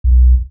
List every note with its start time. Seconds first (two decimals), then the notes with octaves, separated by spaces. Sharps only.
0.04 B1